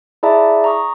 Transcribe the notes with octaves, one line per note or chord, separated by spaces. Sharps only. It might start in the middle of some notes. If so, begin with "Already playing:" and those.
E4 G#4 D5 E5 A5 A#5
A#5 C#6 D#6